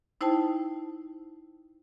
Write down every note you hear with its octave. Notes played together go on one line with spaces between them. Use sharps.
D#4 E4 C5 G5 A5